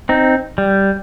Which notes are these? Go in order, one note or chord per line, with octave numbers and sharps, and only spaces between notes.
C4 D#4
G3